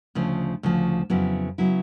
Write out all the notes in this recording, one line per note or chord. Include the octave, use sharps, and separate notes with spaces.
D2 C#3 F3
D2 C#3 F3
F2 C#3 F#3 B3 E4
C#3 F#3 B3 E4